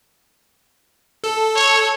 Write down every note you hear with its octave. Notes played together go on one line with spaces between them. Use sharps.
A4
C#5